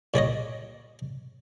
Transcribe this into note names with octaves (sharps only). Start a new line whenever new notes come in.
A#2 G3 C#5 D#5